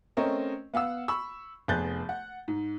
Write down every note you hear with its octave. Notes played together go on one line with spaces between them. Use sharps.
A3 C4 C#4 A#4 D#5
B3 F5 F#5 E6
B5 C#6 E6
F1 B3 G#4 F#6 G6 A6
F#5
G#2